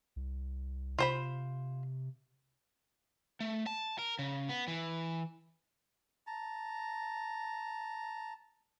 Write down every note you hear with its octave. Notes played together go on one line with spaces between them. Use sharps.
C2
C3 F4 C5 B5
A3
A5
A#4
C#3
B3
E3
A5 A#5